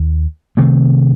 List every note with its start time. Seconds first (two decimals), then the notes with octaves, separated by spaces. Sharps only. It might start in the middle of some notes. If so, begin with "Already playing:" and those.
Already playing: D#2 D#3
0.57 C3 D#3 A3 C4